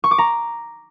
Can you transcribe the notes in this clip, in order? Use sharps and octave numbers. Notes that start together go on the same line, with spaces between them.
C#6
D6
A#5